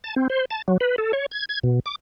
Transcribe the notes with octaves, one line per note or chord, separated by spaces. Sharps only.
A5
C4
C5
A5
F#3
B4
A4
C#5
G#6
G#6
B2
D6